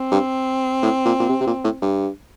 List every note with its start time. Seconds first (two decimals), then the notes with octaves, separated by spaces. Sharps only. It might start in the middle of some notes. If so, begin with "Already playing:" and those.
Already playing: C4
0.11 G2
0.82 A2
1.05 A#2
1.20 A#2
1.29 C3
1.40 C3
1.47 A#2
1.64 A2
1.82 G2